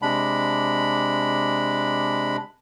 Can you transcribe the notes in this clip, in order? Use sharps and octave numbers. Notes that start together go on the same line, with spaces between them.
C3 G#3 D4 B5